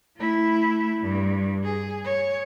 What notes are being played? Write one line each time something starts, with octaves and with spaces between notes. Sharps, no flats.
A3 E4
G2
G#4
C#5